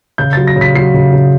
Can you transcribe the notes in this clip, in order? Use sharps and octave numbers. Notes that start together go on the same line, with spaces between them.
C#3 G6
F#3 A6
A#6
C#3
B6
F#3 C7
C#3
C#3